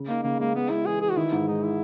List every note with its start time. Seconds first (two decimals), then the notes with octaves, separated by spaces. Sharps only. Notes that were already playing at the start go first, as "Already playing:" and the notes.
Already playing: C#3
0.08 A#3 D#4
0.23 C#3 A#3
0.39 G#3 A#3
0.55 G#3 B3
0.70 G#3 E4
0.86 E3 G#4
1.01 E3 G#4
1.10 F#4
1.17 D#3 E4
1.32 G#2
1.47 G#3 D#4
1.63 E4